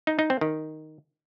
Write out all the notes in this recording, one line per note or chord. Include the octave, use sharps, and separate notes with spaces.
D#4
D#4
C4
D#3